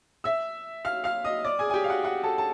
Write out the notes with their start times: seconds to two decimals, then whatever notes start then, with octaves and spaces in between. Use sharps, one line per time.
0.24 E5 E6
0.85 F5 F6
1.04 F5 F6
1.24 D#5 D#6
1.45 D5 D6
1.59 G#4 G#5
1.70 G#5
1.74 G4 G5
1.84 F5
1.89 F#4 F#5
2.04 F#4 F#5
2.23 A4 A5
2.38 A5